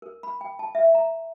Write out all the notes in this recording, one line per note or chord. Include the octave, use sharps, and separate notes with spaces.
A#4
B5
G5
A5
E5
A#5